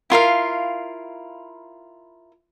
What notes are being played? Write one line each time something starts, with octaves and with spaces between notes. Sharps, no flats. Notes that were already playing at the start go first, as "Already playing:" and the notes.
E4 F4 A#4 F5